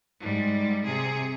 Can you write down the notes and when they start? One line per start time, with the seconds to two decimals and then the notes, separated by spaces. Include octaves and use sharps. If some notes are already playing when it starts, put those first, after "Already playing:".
0.21 G#2 G3
0.85 C3 G#4